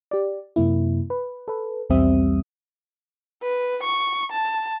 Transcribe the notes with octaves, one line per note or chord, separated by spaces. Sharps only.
G4 D5
F#2 C3 A#3 E4
B4
A4 B4
B1 E2 G3 C4 E5 D#6
B4
C#6
A5